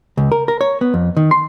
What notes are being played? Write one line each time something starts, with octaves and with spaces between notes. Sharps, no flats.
C#2
A#4
A#4
C#5
B3
F2
D#3
C6